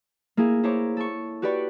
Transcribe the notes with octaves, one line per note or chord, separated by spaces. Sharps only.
A#3 E4 G#4 A#4
E4 C5 C#5 A#5 D6
A4 C#6
F#4 G4 B4 D5 B5 C#6